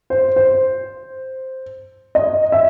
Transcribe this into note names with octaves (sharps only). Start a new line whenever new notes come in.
C5
C5
D#5
E5